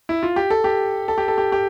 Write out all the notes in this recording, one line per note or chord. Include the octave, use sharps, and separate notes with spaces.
E4
F4
G4
A4
G4
A4
G4
A4
G4
G4